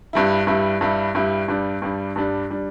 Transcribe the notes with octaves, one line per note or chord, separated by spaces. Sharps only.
G2 G3 E4
G2 G3 E4
G2 G3 E4
G2 G3 E4
G2 G3 D4
G2 G3 D4
G2 G3 D4
G3 D4